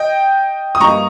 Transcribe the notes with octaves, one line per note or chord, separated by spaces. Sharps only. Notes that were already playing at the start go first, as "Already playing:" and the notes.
Already playing: D#5 G5
D#6
G2 G3 A#3 D#4 A#5 C#6